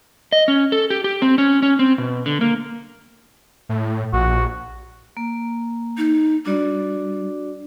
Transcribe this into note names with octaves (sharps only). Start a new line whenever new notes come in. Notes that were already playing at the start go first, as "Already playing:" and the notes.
D#5
C#4
A4
G4
G4
C4
C#4
C#4
C4
B2
D3
A#3
A2
A#1 F#4
A#3
D#4
G3 D4 F#4 D5